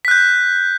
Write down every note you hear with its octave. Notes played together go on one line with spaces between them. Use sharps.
F#6 G6 B6